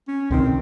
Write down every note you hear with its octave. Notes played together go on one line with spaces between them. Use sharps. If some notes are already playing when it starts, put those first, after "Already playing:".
C#4
C#2 C3 D#3 C4